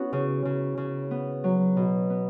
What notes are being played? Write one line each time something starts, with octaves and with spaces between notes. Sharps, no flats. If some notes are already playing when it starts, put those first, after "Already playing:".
Already playing: B3 C#4 E4 F#4
C#3
C#3
C#3
B3
F#3
B2
B3